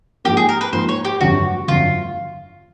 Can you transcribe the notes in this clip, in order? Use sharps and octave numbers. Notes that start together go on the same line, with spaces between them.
G#2 F3 A#3 G4
G#4
A#4
B4
G#2 F3 A#3 C5
C#5
G4
G1 F2 D3 F#3 A3 F#4
G1 F2 D3 F#3 A3 F4